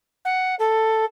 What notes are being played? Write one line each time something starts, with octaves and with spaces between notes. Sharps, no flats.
F#5
A4